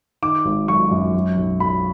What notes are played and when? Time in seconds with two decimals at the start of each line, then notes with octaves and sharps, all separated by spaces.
0.22 D#3 D6
0.45 G#1
0.68 F#3 C#6
0.91 F#2
1.14 F#3
1.37 B1
1.60 B1 B5